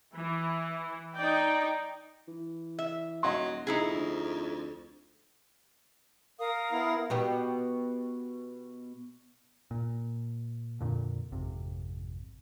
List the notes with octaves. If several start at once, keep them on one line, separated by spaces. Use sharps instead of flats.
E3
D#4 D5 G5
E3
E5
D#1 F#3 D#5 F#5 C6
A#1 F2 D#4 E4 G#4
D2
A#4 F5 D#6
B3 E4
B2 B3 G4
A#2
F2 A#2 D3
G#1 F2 C3